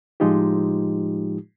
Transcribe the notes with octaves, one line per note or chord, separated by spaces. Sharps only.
A2 F3 G#3 D#4 F4 G4